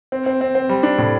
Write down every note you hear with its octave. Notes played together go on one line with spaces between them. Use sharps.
C4
C4
C4
C4
G3
D4
A2